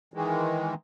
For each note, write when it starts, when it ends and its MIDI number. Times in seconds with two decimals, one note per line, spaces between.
0.14 0.74 51
0.14 0.74 52
0.14 0.74 56